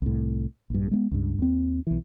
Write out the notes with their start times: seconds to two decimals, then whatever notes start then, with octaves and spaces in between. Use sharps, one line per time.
0.02 C2 A2
0.70 A#1 G2
0.91 G#3 A3 B3
1.11 C#2 G2
1.39 D#2 C4
1.87 B1 E3